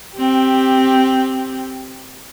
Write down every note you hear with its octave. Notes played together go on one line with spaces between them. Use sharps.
C4 G4